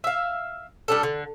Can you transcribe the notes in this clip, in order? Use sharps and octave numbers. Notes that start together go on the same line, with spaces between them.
E5 F5
G3 D4 A4
D3